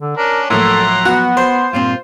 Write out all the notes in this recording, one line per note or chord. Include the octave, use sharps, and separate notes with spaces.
D3
C#4 D4 A#4
A2 F3 F#3 A#3 A4 F#5 A#5 C6
B3 F#4
C5 C6
G2 A#2 C4 F4